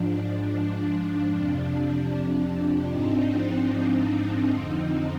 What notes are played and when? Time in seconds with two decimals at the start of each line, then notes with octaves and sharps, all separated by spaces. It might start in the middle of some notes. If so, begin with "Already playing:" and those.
Already playing: G#2 F3 D4
0.49 D4
1.29 F2 C3 F3
2.89 G#2 F3 C4 D#4
3.70 C4 D#4
4.49 F2 D3 F3